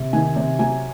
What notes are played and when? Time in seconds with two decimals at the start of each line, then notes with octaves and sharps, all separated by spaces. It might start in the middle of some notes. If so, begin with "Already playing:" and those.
Already playing: C3
0.13 D#3 G#5
0.36 C3
0.59 F#3 G#5